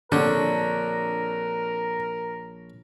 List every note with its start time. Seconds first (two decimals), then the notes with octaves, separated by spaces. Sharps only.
0.12 A#1 D3 C4 D4 A#4 C#5